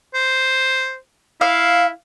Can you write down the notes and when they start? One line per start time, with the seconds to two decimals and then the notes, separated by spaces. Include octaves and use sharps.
0.14 C5
1.41 E4 F5